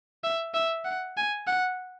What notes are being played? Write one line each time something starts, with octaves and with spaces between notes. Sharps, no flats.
E5
E5
F#5
G#5
F#5